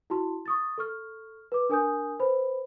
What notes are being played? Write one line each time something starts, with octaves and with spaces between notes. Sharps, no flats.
E4 F#4 A5 C6
C#6 D#6 A6
A4 C#6 F6
B4 D6
D4 A#4 G#5 D#6 G6
B4 C5 B5